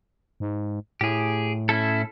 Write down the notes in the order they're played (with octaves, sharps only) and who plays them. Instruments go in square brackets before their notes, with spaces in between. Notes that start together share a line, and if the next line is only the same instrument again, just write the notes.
[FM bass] G#2
[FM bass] A2 [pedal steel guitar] G4 G#4
[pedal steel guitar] C#4 E4 A4